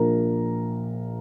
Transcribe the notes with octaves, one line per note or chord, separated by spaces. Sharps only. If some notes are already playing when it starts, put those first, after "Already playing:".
Already playing: A#1 A#2 F3 A#4 A#5